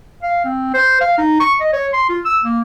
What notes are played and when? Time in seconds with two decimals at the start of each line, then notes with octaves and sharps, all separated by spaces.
0.23 F5
0.45 C4
0.74 C5
1.01 F5
1.18 D#4
1.40 C#6
1.61 D#5
1.73 C#5
1.93 C6
2.09 F4
2.25 E6
2.44 A#3